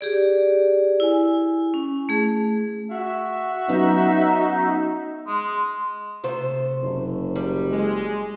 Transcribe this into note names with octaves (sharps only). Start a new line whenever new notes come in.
G4 G#4 D5
E4 G#5
C#4
A3 G#4
F#4 E5
F#3 B3 C#4 D#4
G#3
C3 A3 C5
F#1
G3
G#3